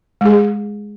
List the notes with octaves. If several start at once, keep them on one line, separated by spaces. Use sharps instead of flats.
G#3 G#4